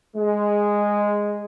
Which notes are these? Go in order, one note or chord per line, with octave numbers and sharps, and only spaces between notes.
G#3